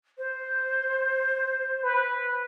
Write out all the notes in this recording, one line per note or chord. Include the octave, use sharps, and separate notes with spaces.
C5
B4